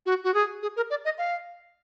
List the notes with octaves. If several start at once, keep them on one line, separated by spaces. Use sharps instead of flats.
F#4
F#4
G#4
G#4
A#4
D5
D#5
F5